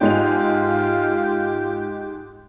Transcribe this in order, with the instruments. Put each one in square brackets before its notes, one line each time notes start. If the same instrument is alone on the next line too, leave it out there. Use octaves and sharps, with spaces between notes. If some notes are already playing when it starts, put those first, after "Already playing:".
[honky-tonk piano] G#2 G#3 F7 [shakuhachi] F4 [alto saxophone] G4